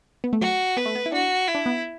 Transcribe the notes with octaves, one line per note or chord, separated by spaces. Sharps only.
B3
A3
F#3 F#4
B3 B4
A3
B3
E4
D4 F#4
E4
D4
B3